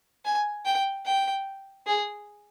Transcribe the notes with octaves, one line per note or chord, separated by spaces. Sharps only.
G#5
G5
G5
G#4